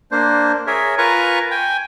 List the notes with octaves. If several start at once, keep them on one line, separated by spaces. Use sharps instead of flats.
A#3 D4 C5
G#4 A#4 C#5 E5
F4 A#4 B4 G#5 A#5 C#6
G5 G#5